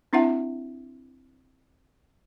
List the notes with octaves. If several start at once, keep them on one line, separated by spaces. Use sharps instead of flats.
C4 D4 E4 E5 F#5 A5